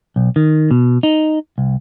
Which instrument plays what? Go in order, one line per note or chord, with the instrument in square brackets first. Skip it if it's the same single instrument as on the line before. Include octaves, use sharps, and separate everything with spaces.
[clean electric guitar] B1
D#3
B2
D#4
C2